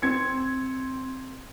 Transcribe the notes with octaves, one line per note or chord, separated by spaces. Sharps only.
C4 G#6 C#7